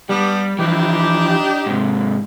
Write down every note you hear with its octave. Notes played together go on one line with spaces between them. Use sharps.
G3 B3 D4 G4
E3 F3 D4 D#4 G4
G#2 C3